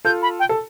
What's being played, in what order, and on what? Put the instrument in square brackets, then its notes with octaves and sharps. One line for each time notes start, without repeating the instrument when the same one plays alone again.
[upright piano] F4 A4 [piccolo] G6
[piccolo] B5
G5
[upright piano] A4